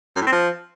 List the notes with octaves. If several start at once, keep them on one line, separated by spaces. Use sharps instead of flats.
F#2
A2
C4
F3